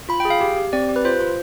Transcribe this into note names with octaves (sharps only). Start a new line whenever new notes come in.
F4 B5
G5
G#4
F5
G4
G4
C4 D5
G4
B4
F4 C5
F4